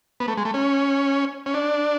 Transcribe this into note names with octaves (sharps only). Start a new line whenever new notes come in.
B3
A3
G#3
A3
C#4
C#4
D4